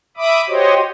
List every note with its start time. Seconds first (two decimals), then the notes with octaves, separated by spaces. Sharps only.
0.17 E5 B5 D6 D#6
0.48 F#4 G4 C5 C#5 D#5